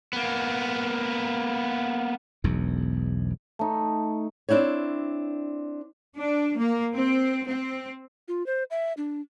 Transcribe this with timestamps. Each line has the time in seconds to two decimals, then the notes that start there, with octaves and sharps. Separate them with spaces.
0.13 A#3 B3
2.44 E1 B1 E2
3.59 A3 D#4
4.49 C4 D4 E4 C5 C#5
6.17 D4
6.58 A#3
6.95 C4
7.47 C4
8.28 F4
8.46 C5
8.71 E5
8.97 D4